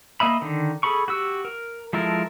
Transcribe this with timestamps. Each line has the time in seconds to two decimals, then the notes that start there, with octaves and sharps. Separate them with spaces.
0.20 A#3 D#5 E5 B5
0.41 D3 D#3
0.83 G#4 A4 B5 C#6
1.08 F#4 G4 E6
1.45 A#4
1.93 F3 G#3 E4 A4 A#4